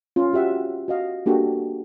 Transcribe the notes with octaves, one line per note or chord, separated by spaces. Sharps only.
C#4 F4
F#4 G4 E5 F#5
F#4 D#5 F5
A#3 D4 F#4 G4 A4